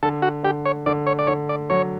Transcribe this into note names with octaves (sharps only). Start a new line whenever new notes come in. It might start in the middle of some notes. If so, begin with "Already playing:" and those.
D3 A4
F#4
D3 G4
C#5
D3 D5
C#5
D5
D3 C#5
D5
F#3 C#5